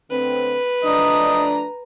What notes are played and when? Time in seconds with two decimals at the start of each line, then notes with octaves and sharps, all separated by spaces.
0.11 D3 A3 C4 B4
0.85 F3 A3 D4 D#5 A#5